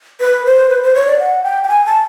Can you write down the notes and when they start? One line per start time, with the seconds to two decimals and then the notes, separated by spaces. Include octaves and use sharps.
0.20 B4
0.45 C5
0.70 B4
0.83 C5
0.95 C#5
1.07 D5
1.19 F#5
1.44 G5
1.64 G5
1.68 G#5
1.85 A5